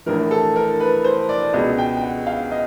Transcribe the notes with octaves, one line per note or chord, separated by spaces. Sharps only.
A#1 A2 E3 A#4
A4
A#4
B4
C5
D5
C#2 B2 G#3 B3 D#5
G5
G5
F#5
F5
D#5